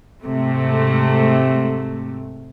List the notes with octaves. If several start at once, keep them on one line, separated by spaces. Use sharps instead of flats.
G#2 C3 A3